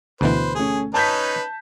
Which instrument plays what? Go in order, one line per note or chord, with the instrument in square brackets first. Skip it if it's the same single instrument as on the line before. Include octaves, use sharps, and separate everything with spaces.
[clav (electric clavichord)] D2 B2 E3 [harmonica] B4 C5
[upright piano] A3 C#4 [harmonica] G#4
[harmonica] C#4 D#4 B4 [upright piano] A5 G6 B6